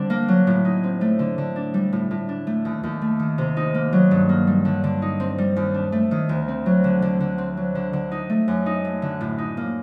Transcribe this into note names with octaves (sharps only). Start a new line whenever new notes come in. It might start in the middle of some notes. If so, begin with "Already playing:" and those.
Already playing: D3 G3 C4 D4
A#3
F#3
A2
D#4
C4
A3
D3
D3
D4
G3
A2
A2
D4
A3
D#2
D#2
A3
D#3
C3
D#4
A#3
F#3
G2
A#3
G3
D3
D3
D#4
C4
G3
D#2
D4
A3
D#3
D2
C4
F#3
D3
D3
D3
C4
F#3
D3
D3
D#4
A3
F#2
D#4
A3
D3
A2
D#4
A#3